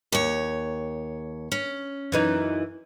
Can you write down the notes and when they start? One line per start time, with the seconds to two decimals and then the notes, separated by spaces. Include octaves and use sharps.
0.12 D#2 C#5
1.52 C#4
2.12 F#2 E3 D#4